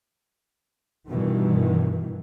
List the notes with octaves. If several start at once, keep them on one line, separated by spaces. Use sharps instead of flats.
G2 B2 D#3 E3